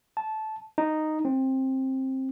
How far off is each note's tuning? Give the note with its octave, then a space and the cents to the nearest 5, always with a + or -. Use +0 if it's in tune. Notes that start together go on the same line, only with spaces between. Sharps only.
A5 -15
D#4 -5
C4 +15